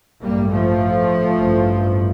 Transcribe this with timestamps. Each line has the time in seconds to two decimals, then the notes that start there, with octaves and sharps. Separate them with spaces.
0.22 A1 G2 G3 A#3
0.50 F3 A3
1.37 A1 G2